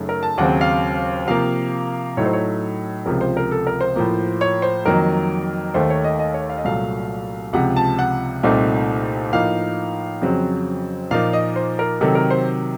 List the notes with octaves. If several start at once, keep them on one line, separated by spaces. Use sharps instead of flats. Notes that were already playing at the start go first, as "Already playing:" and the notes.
Already playing: F#2 C#3 A3 D#4
A#4
A5
D#2 C#3 F#3 C4 F#5
F5
C3 F3 A#3 F5
A2 F#3 A3 D#4 C#5
C5
C#5
C#2 C3 F3 A#4
C5
A#4
A4
A#4
C5
A2 F3 A#3
C#5
C5
F2 D#3 F#3 A#3 A#4
D#2 D#3 A3 C5
C#5
D#5
D#5
C#5
F5
D#5
C2 A#2 F#3 A3 F5
C#2 C3 F3 F#5
A5
F#5
C2 A#2 A3 C4 D#4
A2 F3 A#3 D#4 F5
F2 C#3 F#3 C4
A#2 F3 A#3 D#4 F5
D#5
C5
A#4
C3 D#3 F#3 A4
A#4
C5